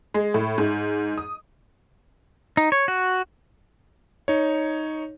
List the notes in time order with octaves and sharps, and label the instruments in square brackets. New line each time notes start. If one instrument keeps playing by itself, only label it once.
[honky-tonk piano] G#3
A2
G#2
D#6
[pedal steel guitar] D#4
C#5
F#4
[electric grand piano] D#4 C#5